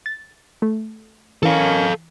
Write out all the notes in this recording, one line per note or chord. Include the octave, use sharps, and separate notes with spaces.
A6
A3
E3 C#4 A4 A#4 F5